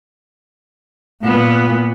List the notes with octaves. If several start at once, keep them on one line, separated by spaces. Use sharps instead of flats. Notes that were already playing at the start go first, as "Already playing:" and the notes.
A#2 B3